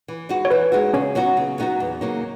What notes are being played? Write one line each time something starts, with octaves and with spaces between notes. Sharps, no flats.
E3
G#3 D#4 F#4
C#5
E3 B4
G#3 D#4 F#4
C#3 C#4 C#5
F#3 B3 D#4 F#4
C#3
F#3 B3 D#4 F#4
E2
C#3 F#3 A#3 D#4